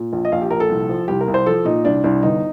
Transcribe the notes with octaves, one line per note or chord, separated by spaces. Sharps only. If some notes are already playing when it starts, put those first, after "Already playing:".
Already playing: A#2
A#1
D#5
A#1 F5
G4
A#1 A#4
A4
C2
F3
C2 G4
A#4
C2
C5
F3 A4
A#2 D#4
C2 D4
C2 D4
G1 D#4